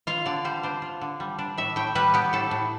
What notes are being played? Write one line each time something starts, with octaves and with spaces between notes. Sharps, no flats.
F4 F5
D3 D5
G3 C5
D4 C5
F4
D3
G3
D4
A2 E5
A2 G5
G3 B4
B3 G4
A2 A4
A2